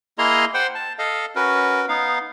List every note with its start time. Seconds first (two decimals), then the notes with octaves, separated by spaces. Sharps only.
0.18 A#3 E4 G#4 D#5 A#5 C6
0.54 C5 F#5 G5 C6
0.75 A5
0.99 A4 D#5 F5
1.36 C#4 F#4 A#4 B4
1.89 B3 D#4 F5